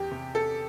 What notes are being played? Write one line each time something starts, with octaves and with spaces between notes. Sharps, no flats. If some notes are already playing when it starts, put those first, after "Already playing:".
Already playing: E2 G4
C3
A4